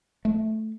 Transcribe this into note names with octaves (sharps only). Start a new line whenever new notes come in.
A3